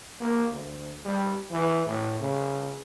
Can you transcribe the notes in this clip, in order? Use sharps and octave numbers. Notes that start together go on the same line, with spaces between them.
A#3
D2
G3
E3
A2
C#3